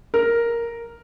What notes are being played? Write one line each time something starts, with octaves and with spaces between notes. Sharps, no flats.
A#4